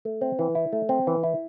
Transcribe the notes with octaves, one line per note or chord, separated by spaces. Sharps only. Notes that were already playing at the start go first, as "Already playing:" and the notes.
A3
C4
E3
E4
A3
C4
E3
E4